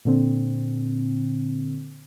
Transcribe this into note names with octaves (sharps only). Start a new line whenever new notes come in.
A#2 D3 C4